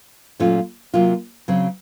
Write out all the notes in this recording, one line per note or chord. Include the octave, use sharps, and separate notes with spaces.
A#2 F#3 A3 C#4 F4
C3 F#3 A#3 F4
C#3 F#3 C4